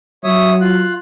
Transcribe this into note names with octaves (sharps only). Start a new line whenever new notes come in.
F#3 C#5 E5 D#6
F4 F#6